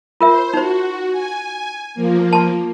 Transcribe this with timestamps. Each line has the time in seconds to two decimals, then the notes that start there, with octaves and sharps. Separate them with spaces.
0.21 F4 A#4 C5 E5
0.54 D#4 F#4 C5
1.10 G#5
1.94 F3 A#3
2.33 A5 C6